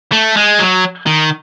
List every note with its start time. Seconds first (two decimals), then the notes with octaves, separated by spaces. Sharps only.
0.12 A3
0.36 G#3
0.59 F#3
1.06 D#3